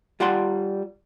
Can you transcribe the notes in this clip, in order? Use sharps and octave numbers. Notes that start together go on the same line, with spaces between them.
G3 F4 D5 F#5 A5 C6